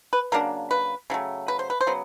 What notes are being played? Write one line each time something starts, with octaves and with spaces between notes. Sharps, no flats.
B4
C#3 F#3 A#3 D4 A#4
B4
C#3 F#3 A3
B4
C5
B4
C5
C#3 F#3 B3